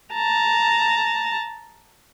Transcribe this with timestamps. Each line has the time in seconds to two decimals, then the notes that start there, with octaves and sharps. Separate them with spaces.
0.14 A5 A#5